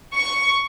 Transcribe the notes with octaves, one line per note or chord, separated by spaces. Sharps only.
C#6